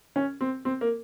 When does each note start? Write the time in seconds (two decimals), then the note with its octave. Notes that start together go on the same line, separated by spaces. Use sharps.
0.16 C#4
0.41 C4
0.65 C4
0.81 A#3